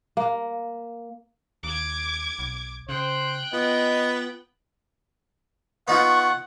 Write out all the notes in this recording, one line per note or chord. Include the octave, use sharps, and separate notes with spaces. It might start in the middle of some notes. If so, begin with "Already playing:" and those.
A#3
D#2 D6 G#6
B1
C#3 C5 G5 F#6
B3 F4 D#5
B3 D#4 F4 F#5 C#6